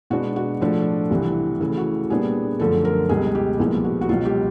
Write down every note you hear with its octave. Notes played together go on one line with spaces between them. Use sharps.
B2 G#3 B3 D4 F#4
F#4
A2 F3 A3 D4
C2 C3 E3
C#3 E3 A3
F#4
A#2 G3 B3 D4 G#4
F#2 D3 F3 A3 A4
A#4
C#2 B2 G3 G#4
G4
C2 A#2 F3 G#3 B3
F#4
F#4
C#2 B2 F#3 F4
G4